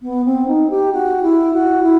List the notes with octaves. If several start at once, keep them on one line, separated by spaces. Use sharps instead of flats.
B3
C4
D#4
G4
F#4
E4
F#4
E4